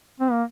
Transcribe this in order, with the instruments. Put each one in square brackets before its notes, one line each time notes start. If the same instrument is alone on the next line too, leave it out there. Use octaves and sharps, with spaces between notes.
[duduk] C4
A#3